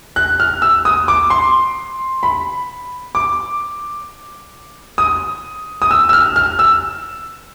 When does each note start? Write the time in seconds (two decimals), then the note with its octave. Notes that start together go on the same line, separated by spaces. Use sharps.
0.16 F#6
0.40 F6
0.62 E6
0.85 D#6
1.08 D6
1.30 C6
2.23 B5
3.15 D6
4.98 D#6
5.82 D#6
5.91 E6
6.09 E6
6.13 F6
6.36 F6
6.59 E6